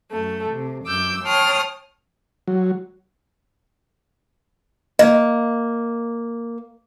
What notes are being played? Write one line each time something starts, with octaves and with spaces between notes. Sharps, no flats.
F#2 A3
C3
F#2 D6 E6 G6
C#5 G5 A5 C6 D#6 F6
F#3
A#3 D#5